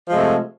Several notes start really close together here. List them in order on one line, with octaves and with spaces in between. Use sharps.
F3 G#3 C3 A3